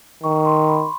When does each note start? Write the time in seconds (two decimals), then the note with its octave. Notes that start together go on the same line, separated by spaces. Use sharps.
0.23 D#3 C#6
0.45 C6
0.68 B5